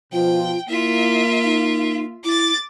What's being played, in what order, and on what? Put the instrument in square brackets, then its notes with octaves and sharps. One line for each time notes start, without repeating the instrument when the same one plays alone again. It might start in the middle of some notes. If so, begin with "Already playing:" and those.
[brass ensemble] B2 F3 [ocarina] F4 [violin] G5
[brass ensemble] A#3 [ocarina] E4 [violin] F4 E5
[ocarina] D#4
[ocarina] E4 [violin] D6 A6